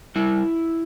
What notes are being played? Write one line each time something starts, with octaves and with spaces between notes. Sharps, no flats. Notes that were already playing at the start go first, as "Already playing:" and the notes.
G3 E4